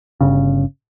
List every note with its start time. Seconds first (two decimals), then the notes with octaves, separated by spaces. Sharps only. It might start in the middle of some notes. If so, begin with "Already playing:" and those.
0.21 G1 C#3